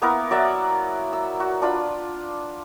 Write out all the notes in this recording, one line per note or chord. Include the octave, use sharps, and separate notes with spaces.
A#3 B3 E4 A#4
F#3 D5 E5 F#5
E6
F#4
D4 F4 B5